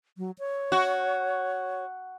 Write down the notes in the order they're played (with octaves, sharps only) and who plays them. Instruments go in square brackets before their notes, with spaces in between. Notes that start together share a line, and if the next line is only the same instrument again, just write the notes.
[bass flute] F#3
C#5
[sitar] F#4